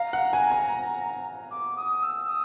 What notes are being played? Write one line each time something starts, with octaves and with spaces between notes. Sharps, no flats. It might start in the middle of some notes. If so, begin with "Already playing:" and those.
Already playing: F5 A#5
F#5
G#5
G#5
D6
D#6
E6
D#6